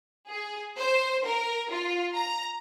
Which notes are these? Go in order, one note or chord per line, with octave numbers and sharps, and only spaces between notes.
G#4
C5
A#4
F4
A#5